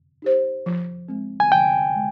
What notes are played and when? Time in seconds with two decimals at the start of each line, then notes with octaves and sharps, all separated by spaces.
0.22 D#4 G4 C5
0.66 F3
1.09 G#3 C4
1.40 G#5
1.51 F3 G5
1.95 G#3